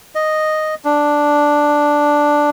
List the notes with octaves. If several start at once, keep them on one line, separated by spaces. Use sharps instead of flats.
D#5
D4